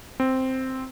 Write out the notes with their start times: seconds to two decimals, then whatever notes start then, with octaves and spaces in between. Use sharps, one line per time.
0.20 C4